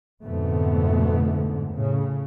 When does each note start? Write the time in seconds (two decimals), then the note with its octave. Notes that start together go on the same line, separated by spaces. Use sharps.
0.24 F2 G#2 B2 D3 A3 B3
1.72 A2 C#3